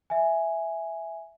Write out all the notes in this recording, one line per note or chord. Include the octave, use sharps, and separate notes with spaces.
E5 G#5